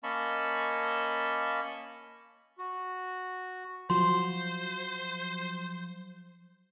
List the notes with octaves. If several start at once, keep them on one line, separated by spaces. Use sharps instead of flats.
A#3 C#4 D#5 A5 B5 C#6
F#4
F3 F#3 C5 C6